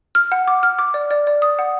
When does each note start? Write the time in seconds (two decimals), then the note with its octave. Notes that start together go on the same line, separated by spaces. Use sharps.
0.15 F6
0.32 F#5
0.47 D6
0.63 F6
0.79 D6
0.94 D5
1.11 D5
1.27 D5
1.42 D#6
1.59 F#5